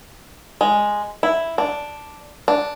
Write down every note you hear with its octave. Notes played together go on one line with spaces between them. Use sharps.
G#3
E4
D4
D4